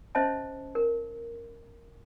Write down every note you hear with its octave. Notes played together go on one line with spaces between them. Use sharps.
C#4 C5 D#5 E5 A5
A#4